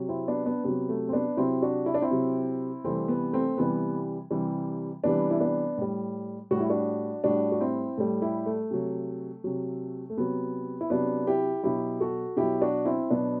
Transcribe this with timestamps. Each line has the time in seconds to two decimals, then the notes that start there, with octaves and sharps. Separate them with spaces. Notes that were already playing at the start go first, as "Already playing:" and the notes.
Already playing: C3 F#3
0.09 C4 E4
0.28 B3 D4
0.46 B3 D4
0.64 C3 F#3 B3
0.89 A3
1.09 C4
1.13 B3 D4
1.37 C3 F#3 C4 E4
1.62 D4 F#4
1.86 E4
1.94 D4
2.02 C4 E4
2.11 C3 F#3
2.84 C3 E3 G3 A3 C4
3.08 B3
3.32 A3 C4
3.57 C3 E3 G3 B3
4.31 C3 E3 G3
5.04 C3 E3 G3 B3 D4
5.31 E4
5.40 B3 D4
5.78 A2 G3
6.51 A2 G3 F#4
6.60 E4
6.70 D4 F#4
7.24 A2 G3 D4 F#4
7.52 F#4
7.61 C4 E4
7.98 A2 G3 A3
8.22 E4 G4
8.46 A3
8.71 C3 F#3
9.44 C3 F#3
10.10 A3
10.17 C3 F#3 B3
10.81 E4
10.90 C3 F#3 B3 D4
11.27 E4 G4
11.63 B2 F#3 E4 G4
12.00 F#4 A4
12.37 B2 F#3 E4 G4
12.62 D4 F#4
12.85 C4 E4
13.10 B2 F#3 B3 D4